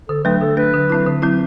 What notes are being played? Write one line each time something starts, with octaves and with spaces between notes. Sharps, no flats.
D3 A4
F#3 A3 D4 B4
D3 A4
F#3 A3 D4 B4
D3
F#3 C4 E4
D3
F#3 C4 E4